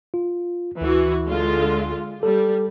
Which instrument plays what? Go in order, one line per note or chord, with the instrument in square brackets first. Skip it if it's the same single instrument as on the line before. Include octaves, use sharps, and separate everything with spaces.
[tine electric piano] F4
[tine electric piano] D2 [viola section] E3 F#4
[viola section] D3 G#3 F4
[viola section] G3 [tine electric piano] A4